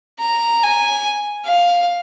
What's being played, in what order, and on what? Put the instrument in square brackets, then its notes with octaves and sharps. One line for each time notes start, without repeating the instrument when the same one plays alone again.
[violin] A#5
G#5
F5